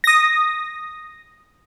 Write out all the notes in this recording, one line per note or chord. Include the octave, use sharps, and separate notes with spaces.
D#6 A#6